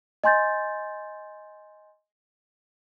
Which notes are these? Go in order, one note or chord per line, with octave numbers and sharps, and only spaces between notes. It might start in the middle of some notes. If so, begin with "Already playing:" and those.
D#5 G#5 C6 G6 A6